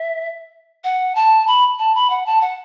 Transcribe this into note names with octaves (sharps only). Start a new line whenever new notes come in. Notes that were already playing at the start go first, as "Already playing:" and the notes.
Already playing: E5
F#5
A5
B5
A5
B5
F#5
A5
F#5